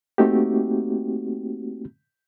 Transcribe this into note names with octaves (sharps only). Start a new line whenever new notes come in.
A3 A#3 C4 D#4 F#4 G4